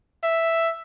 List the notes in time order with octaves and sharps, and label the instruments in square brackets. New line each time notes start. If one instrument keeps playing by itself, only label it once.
[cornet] E5